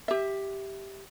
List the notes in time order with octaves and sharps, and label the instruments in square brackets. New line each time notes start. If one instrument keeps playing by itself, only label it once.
[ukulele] G4 E5